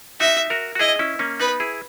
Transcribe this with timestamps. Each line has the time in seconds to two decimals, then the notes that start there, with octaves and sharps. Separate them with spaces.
0.20 D#4 F#4 E5
0.50 F#4 A#4
0.75 F#4
0.79 E4 G#4 D#5
0.99 C#4 E4
1.19 A#3 C#4
1.40 B3 D#4 B4
1.60 E4 G#4